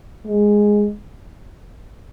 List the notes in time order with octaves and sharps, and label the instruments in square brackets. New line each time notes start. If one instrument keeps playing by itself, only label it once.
[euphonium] G#3